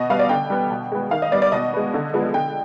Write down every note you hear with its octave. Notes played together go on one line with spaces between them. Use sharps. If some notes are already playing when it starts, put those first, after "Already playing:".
Already playing: B2 D#5
G3 B3 F5
D5
D3 G5
G3 B3
B2
G#3 B3
D#3 F5
D#5
G3 B3 D5
D5
B2 D#5
G#3 B3
D3
F3 G#3 B3
D3 G5